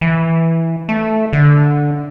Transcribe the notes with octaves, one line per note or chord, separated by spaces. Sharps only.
E3
A3
D3